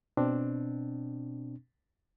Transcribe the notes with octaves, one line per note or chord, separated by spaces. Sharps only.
B2 C4 D4